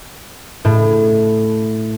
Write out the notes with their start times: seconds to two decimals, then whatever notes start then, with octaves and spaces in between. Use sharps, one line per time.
0.65 A2